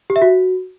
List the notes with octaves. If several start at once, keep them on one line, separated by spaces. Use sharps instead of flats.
G4
E5
F#4